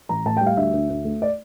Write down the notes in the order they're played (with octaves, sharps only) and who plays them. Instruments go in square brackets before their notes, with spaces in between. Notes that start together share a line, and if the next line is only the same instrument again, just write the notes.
[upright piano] A1 A#5
A2 A5
G3 G5
F5
D2 E5
D2
D2
A3
D5